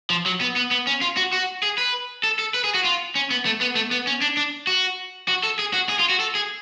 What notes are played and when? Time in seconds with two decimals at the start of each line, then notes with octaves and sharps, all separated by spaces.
0.10 F3
0.26 F#3
0.41 B3
0.56 B3
0.71 B3
0.87 C#4
1.01 F4
1.17 F#4
1.33 F#4
1.63 G#4
1.78 B4
2.23 A4
2.39 A4
2.54 B4
2.64 G#4
2.74 F#4
2.84 F4
3.15 C#4
3.31 B3
3.45 A3
3.61 B3
3.75 A3
3.91 B3
4.07 C#4
4.21 D4
4.37 D4
4.67 F#4
5.28 F#4
5.43 A4
5.59 G#4
5.74 F#4
5.89 G#4
5.99 F4
6.09 F#4
6.20 A4
6.35 G#4